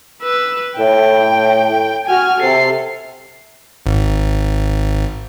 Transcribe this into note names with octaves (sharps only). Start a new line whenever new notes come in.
B4 E6
A2 G5
F#4 G#5 F6
C3 A4 C7
G#1